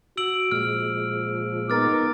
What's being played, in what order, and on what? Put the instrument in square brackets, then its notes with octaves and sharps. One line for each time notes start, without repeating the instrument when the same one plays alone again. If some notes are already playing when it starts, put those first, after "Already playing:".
[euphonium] F#4 [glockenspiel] E6 D7 F#7
[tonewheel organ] A#2 G#3 [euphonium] F3 [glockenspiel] F6
[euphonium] B3 [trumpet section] D#4 A#4 D6 [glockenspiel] F6 A6